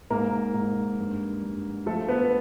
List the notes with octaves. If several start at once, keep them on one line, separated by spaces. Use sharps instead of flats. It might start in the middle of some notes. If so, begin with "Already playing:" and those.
G#2 A#3 A#4
G#2
G2
G2
F3 A3 A4
B3 B4